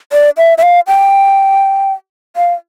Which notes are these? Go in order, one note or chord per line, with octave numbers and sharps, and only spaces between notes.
D5
E5
E5
F5
G5
F5